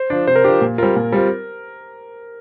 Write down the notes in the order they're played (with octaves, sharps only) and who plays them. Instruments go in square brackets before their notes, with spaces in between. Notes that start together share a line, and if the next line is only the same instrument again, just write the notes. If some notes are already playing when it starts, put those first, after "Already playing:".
Already playing: [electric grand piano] C5
[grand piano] F3 D4
[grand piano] C3 [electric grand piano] C5
[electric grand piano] A#4
[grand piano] D4 [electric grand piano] G4
[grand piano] F3
A#2
[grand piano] G3 C4 F4 [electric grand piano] A#4
[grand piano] A#2
G3 C4 F4